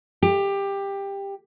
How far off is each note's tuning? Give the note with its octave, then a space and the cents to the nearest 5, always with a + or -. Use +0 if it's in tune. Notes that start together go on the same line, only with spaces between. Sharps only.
G4 +15